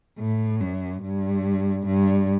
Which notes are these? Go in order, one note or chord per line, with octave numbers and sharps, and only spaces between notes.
A2
F#2
G2
G2